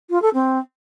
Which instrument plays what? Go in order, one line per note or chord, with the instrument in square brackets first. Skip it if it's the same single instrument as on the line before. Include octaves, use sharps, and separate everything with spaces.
[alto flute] F4
A4
C4